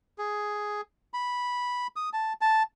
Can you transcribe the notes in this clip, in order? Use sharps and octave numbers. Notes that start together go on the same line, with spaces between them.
G#4
B5
D#6
A5
A5